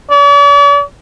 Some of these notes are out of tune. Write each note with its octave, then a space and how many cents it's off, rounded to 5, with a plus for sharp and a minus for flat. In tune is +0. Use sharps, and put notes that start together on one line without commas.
D5 -45